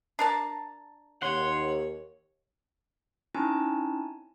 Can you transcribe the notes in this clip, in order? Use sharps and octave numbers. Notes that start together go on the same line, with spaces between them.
D4 A#4 A5
D#2 C#5 F#5 C6
C4 C#4 D#4 E4 G#5 A5